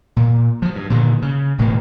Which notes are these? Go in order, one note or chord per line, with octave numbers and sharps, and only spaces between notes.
A#2
F3 F#3
G2
A#2 D3 D#3
C#3
E1 A2 D#3 A#3